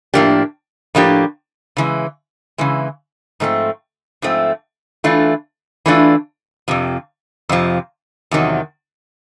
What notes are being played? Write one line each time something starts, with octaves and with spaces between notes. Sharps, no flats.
A2 F3 A#3 D4 G4
A2 F3 A#3 D4 G4
C#3 E3 G#3
C#3 E3 G#3
G#2 F3 A3 C4
G#2 F3 A3 C4
E3 A3 D4 F4
E3 A3 D4 F4
F2 C3 F3
F2 C3 F3
E2 C3 D#3 F#3